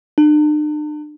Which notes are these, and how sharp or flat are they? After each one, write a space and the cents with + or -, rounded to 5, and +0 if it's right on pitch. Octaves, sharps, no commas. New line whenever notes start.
D4 +45